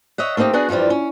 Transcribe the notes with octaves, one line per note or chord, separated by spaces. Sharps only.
C#5 D#5 E5 F#5
A3 A#3 C4 D#4 G4
B3 D4 F#4 G#4
G2 E3 F3 G3 F4
C#4